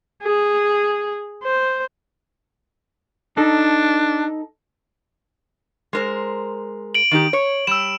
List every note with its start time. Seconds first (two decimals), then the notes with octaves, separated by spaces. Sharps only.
0.23 G#4
1.43 C5
3.37 D4 D#4 A4
5.93 G#3 A#4 C5
6.95 D7 F#7
7.11 D#3 D#4 G4
7.33 C#5
7.67 G3 E6 E7